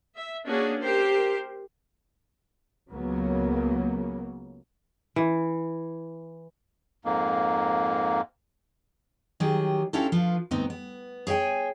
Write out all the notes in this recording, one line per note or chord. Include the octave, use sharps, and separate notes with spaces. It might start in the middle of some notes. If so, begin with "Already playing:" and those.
E5
A#3 C#4 D4 F#4 G#4
G4 A#4 C5
C#2 C#3 F#3 A#3 B3
E3
F2 G#2 A#3
D#3 F#3 G4 G#4
C#4 D4 E4 F4 G4 A4
F3 F4 B4
D2 G2 B3 C4 D#4
B3
G#4 C#5 E5 G5 G#5